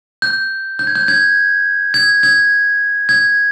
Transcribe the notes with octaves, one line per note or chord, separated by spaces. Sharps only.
G6
G6
G#6
G6
G#6
G#6
G#6
G#6